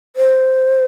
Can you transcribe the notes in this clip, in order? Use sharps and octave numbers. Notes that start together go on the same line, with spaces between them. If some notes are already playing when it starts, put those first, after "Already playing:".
C5